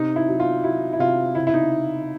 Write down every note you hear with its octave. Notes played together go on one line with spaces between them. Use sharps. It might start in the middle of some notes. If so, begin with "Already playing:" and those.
Already playing: C3 D#4
E4
F#3
F4
F#3 E4
E4
C3 F4
C#3 E4
E4
D#4